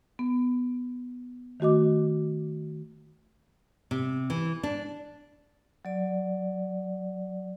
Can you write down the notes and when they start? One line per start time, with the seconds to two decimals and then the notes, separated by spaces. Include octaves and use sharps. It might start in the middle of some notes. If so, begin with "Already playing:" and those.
0.19 B3
1.60 D#3 A3 F#4 D#5 D6
3.91 C3
4.30 E3
4.63 D4
5.85 F#3 D5